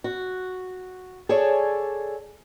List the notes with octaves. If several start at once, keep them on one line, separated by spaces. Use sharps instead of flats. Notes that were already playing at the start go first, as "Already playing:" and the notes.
F#4
G#4 A4 C#5 D5 G#5 A5